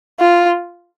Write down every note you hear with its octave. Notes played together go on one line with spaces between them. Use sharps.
F4